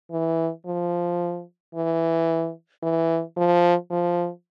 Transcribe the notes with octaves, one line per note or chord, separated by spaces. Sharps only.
E3
F3
E3
E3
F3
F3